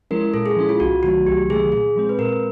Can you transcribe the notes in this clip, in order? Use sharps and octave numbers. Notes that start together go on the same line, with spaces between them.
F3 G#3 C#4 E4 A#4
A#2 A4
G#4
F3 G#3 C#4 E4
F4
C2 F#4
C3 D#3 F#3 A3 F#4
C2 G4
C3 D#3 F#3 A3 G#4
A#2 G#4
F3 G#3 C4
B4
A#2 A#4